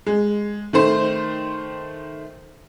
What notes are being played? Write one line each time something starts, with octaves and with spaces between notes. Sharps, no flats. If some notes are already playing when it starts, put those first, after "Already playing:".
G#3
D#3 A3 C5